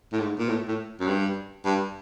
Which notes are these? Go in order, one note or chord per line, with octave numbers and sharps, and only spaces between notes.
A2
G#2
A#2
A2
A2
F#2
G2
G2